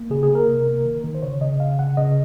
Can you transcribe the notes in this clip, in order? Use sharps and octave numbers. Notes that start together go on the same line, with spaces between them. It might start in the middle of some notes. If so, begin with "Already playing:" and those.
Already playing: A#3
C#3 G#4
G#4
A#3
A#4
C3
A#3
D#3
D#3
C5
C#3 C#5
C#3 D#5
C#3 F5
C#3 F#5
C#3 D#5